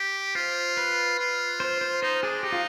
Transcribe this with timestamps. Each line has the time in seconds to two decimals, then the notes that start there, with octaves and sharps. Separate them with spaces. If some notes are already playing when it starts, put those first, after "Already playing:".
Already playing: G4
0.35 F4 C5
0.77 B4
1.19 F4
1.60 C5
1.81 C5
2.02 D#4 C5
2.22 D4 G#4
2.43 D#4 G4
2.52 F4